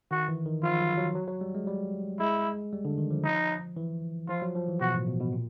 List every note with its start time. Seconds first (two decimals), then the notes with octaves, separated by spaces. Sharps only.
0.11 D#3 F#4
0.28 E3
0.46 D#3
0.63 F3 F4
0.80 F#3
0.97 F#3
1.15 F#3
1.28 F#3
1.41 G3
1.55 G#3
1.67 G3
2.19 G#3 E4
2.73 G3
2.85 D3
2.98 D#3
3.11 F3
3.24 D#4
3.77 E3
4.28 F3 F4
4.42 F#3
4.55 F3
4.68 E3
4.80 B2 F#4
4.94 A2
5.07 B2
5.20 B2
5.33 A#2